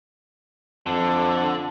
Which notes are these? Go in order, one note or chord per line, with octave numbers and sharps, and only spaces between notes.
F2 D3